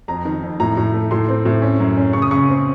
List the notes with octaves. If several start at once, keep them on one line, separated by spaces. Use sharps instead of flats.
F2 A#5
D#3
F2
A2 A#5
A2
A3
A2 C6
C4
A2
C#4
F#2
C#4
C#3 C#6
D#6
C#3 C#6
C4